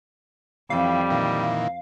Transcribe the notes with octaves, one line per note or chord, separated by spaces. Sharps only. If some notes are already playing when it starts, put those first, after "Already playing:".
F2 E3 G3 F5
A#2 D#3 E3